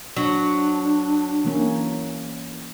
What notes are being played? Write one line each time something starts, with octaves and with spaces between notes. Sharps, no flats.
F#3 D4
E3 A#3 C#4